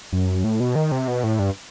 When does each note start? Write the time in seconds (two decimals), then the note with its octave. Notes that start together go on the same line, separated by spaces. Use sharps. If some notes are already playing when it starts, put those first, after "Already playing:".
0.12 F#2
0.44 A2
0.60 B2
0.75 D#3
0.92 C3
1.08 B2
1.24 A2
1.39 G2